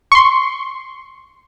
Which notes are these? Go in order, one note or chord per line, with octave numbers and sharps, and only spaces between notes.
C6 C#6